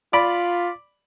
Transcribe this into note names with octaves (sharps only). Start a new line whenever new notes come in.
F4 D5 B5